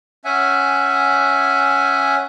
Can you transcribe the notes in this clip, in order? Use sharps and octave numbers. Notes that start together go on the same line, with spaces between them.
C#4 E5 F#5 G#5